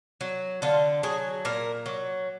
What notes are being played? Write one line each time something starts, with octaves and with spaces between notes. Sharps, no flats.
F#3
D3 F4
F#3 G#4
A#2 A#4
F#3